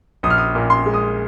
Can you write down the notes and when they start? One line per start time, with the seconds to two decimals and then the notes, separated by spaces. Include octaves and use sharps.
0.23 A#1 D#6
0.30 F6
0.38 D#6
0.55 A#2
0.70 C6
0.86 G#3
0.94 D#6